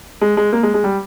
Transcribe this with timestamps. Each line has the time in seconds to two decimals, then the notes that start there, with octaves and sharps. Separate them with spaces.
0.21 G#3
0.37 G#3
0.53 A#3
0.63 G#3
0.74 G#3
0.84 G3